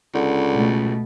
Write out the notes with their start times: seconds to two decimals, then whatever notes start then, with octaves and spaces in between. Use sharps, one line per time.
0.15 C#2 D3
0.54 B2 A3